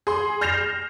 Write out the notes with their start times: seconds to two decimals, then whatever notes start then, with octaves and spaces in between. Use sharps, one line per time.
0.07 G#4 C6
0.41 F6 G6 A#6 C7 E7 F7